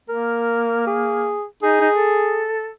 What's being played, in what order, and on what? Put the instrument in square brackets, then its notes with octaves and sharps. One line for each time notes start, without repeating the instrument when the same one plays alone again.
[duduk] A#3 [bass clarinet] A#4
[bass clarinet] G#4
[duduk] D#4 [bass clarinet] G#4
[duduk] D#4
A4